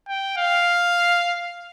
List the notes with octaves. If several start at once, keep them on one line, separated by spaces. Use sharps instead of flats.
G5
F5